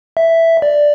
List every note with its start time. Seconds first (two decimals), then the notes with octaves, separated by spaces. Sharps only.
0.17 E5
0.62 D5